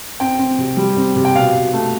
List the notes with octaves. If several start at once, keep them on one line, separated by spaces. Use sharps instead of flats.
C4 G5
C4
C3
G3
C4
C3
G5
B2 F5
B2
A3